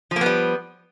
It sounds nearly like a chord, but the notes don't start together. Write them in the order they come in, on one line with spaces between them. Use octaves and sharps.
F3 A#3 B3 G3